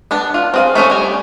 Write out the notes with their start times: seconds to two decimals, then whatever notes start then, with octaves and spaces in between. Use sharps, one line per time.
0.11 B3 D4 A5
0.34 F4
0.54 C4 G#4 F5
0.75 A3 C4 C#4 G#4
0.90 G3 G#5